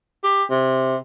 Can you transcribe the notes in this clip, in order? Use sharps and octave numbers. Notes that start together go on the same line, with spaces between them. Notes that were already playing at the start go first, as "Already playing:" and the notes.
G4
C3